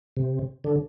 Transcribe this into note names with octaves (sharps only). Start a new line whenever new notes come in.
C3
D3